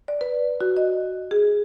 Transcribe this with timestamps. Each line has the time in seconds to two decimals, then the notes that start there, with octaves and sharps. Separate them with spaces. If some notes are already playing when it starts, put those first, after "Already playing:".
0.08 D5
0.21 B4
0.61 F#4
0.77 D#5
1.31 G#4